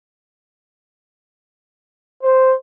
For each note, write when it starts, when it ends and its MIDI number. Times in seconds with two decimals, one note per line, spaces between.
2.23 2.54 72